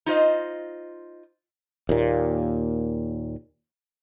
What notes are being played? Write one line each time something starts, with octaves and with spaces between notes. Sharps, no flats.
D#4 F4 C5 D#5
D#2 A#2